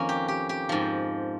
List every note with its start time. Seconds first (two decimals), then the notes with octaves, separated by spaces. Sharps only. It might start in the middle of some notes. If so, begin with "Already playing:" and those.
Already playing: F2 D#3 A#3 C#4
0.09 G4
0.28 G4
0.49 G4
0.69 G#2 F3